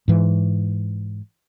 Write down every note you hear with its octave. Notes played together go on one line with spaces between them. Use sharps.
G#2 E3